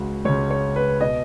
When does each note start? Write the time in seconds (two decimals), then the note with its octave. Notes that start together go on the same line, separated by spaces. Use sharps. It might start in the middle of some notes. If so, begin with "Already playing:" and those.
Already playing: C#2 C#3 F#4
0.25 C#2 C#5
0.29 C#3
0.51 C#5
0.76 B4
1.01 B2 D#5